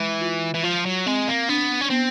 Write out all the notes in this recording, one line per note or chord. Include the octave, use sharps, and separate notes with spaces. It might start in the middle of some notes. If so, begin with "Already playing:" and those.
Already playing: E3 G#3
F4
E3
F3 F4
F#3
G#3 C4
A#3
B3 D4
C#4
B3 C4